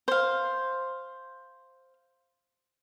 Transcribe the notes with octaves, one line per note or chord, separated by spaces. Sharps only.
C5 F5